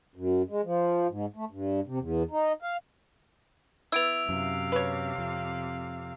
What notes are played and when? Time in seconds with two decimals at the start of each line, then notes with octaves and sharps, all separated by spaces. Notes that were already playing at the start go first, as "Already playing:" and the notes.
0.16 F#2
0.50 G#3
0.64 F3
1.09 G#2
1.36 A3
1.51 G2
1.87 C3
1.99 E2
2.31 D#4
2.62 F5
3.92 B3 E4 E6 D7 F7
4.29 F#2 C3 F5
4.72 B4 C#5
5.18 F2